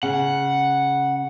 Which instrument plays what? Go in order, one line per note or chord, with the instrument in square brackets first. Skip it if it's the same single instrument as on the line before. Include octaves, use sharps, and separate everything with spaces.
[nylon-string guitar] C#3 [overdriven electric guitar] F#5